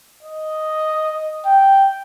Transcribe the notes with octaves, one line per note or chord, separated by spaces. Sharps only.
D#5
G5